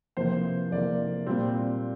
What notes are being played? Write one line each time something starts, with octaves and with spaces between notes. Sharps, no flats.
F2 C3 E3 A#3 C5
F2 C3 E3 A#3 D5
A#2 G3 C4